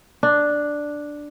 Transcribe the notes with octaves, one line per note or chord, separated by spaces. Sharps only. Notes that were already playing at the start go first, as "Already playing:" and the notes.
D4